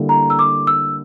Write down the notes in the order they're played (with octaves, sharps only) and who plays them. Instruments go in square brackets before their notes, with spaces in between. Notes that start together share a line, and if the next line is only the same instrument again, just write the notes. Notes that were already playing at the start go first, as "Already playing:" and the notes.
Already playing: [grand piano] D3 G3 A#3 E4 G4
[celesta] A#5
E6
D6
E6